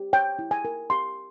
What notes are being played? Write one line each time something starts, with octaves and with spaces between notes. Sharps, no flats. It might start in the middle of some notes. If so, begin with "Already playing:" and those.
Already playing: G4
C#5 G5
E4
G#5
A#4
G4 C6